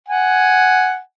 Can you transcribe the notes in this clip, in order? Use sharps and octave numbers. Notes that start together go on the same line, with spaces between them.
F#5 G#5